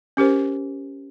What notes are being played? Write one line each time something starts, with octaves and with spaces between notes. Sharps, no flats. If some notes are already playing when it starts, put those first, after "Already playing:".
C#4 G4 A#4 C5